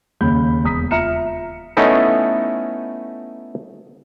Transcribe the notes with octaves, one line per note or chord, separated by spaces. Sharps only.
D#2 C#3 B5 G6
E1 A#5 D#6 B6
F4 E5 A#5 F6 C#7 E7
A3 B3 C#4 D#4 E4